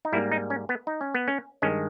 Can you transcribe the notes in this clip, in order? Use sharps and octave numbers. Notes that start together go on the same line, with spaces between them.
D#4
G#2 G3 A#3 E4
D#4
C#4
B3
D#4
C#4
B3
C#4
G2 D#3 G#3 C#4